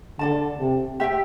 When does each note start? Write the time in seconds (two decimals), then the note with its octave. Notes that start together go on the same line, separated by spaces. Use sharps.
0.19 D3 A4 D5 A5
0.60 C3
1.00 G4 E5 G5